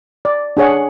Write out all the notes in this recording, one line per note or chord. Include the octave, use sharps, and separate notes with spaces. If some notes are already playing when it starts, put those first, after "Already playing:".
D5
D4 G#4 C#5 F#5